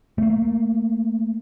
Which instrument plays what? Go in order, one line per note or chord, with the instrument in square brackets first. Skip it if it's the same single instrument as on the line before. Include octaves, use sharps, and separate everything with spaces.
[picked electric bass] A3 A#3